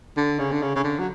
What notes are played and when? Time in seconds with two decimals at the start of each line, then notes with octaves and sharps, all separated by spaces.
0.17 D3
0.39 C#3
0.52 D3
0.62 C#3
0.76 C#3
0.84 D3
0.99 F#3